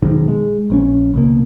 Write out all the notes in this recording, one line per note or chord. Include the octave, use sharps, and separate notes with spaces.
E1 B1 G#2 D#3
G#3
A#1 C4 C#4
C#2 B2 A#3